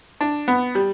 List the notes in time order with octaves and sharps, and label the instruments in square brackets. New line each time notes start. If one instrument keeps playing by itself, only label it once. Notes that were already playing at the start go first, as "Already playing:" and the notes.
[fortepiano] D4
B3
G3